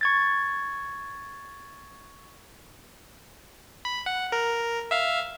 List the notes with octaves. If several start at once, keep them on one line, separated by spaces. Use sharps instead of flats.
C#6 G#6 A6
B5
F#5
A#4
E5 F5